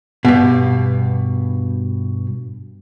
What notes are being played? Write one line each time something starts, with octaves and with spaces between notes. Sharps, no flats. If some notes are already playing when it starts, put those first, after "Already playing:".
G2 B2